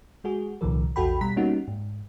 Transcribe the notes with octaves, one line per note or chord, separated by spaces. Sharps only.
G#3 F#4 G#4
C2 A#2 D#3 F3 A#4
A#1 E2 F#4 A4 G5 B5
B2 G3 A#5 B6
G3 A#3 B3 C#4 D#4 F#4
G#2